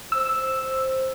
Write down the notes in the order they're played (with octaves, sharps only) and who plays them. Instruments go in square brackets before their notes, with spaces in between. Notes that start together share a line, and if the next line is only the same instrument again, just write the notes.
[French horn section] C5 [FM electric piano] E6